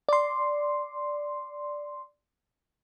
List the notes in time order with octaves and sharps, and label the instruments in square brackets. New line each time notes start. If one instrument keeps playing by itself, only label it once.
[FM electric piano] D5 C6